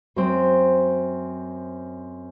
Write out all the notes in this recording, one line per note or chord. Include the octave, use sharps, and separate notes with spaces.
F#2 C4